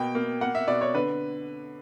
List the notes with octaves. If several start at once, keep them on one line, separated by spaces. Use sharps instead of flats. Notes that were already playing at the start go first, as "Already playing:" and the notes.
Already playing: B2 A#3 G5
A#3
A#3 F#5
E5
B2 D5
C#5
D3 B4